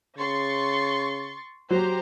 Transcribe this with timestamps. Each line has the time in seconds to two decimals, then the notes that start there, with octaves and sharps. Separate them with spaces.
0.18 C#3 C6 C#6 A6
1.70 F#3 G4 C5 A#5